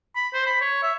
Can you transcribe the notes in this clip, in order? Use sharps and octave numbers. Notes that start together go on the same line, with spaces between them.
B5
C5
B5
C#5
E5